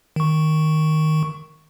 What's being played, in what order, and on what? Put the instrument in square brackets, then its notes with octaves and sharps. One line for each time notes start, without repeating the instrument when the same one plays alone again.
[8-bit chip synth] D#3 C#6